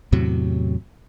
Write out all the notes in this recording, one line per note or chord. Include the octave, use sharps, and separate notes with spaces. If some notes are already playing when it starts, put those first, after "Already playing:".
E2 A2 C3 F#3